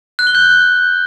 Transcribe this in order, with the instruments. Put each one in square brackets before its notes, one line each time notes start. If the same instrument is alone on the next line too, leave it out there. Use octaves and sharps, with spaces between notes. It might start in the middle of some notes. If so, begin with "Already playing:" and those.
[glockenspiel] F#6
G7
G6